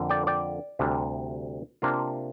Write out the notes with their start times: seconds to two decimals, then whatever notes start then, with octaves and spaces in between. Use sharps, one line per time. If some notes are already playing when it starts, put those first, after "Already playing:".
Already playing: F2 D3 A#3
0.10 D5 G5
0.27 D5 G5
0.79 D2 C3 G3 D4
1.82 C3 A#3 D4 F4